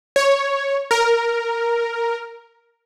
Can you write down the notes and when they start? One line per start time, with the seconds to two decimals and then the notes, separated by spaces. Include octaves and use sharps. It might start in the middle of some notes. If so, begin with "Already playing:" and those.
0.16 C#5
0.91 A#4